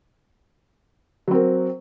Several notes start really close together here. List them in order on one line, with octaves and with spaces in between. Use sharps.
F#3 C4 A#4